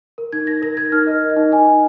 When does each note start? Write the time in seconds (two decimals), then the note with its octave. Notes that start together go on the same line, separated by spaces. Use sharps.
0.18 A#4
0.32 D#4 G#6
0.47 D#4 A#6
0.62 A#4 A#6
0.77 A#4 G#6
0.92 D#4 F6
1.07 A#4 D#5
1.22 A#4
1.30 D#5
1.37 D#4
1.52 D#4 G#5
1.67 D#4